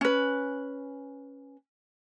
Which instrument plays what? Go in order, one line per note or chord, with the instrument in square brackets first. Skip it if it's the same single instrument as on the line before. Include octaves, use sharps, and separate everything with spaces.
[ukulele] C#4 B4